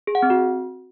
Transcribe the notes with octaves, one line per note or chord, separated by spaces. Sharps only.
G#4
F#5
C4
F#4